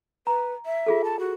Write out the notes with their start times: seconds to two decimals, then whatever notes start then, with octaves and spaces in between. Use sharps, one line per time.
0.27 B4 A#5
0.66 E5
0.86 F4 G#4 A4
1.04 A5
1.19 F#4